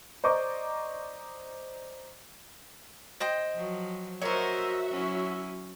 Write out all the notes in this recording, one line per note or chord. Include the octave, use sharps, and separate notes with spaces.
C5 D5 D#5 A#5 C#6 D6
C5 D#5 G5
F3 F#3
F#4 A#4 C5 C#5 D#5 E5 C#6
F#3 C#4 E4